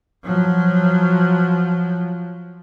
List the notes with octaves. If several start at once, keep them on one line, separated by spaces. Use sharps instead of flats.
F3 F#3